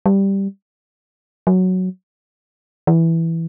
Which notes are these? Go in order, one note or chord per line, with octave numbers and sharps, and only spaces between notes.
G3
F#3
E3